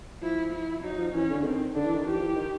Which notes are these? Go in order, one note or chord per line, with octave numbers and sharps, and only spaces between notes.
F3 E4
E4
F#3 D#4
F3
E3 C#4
D3
D#3 C4
D3 D4
E3
D#3
E3 G4
F3
E3
D#3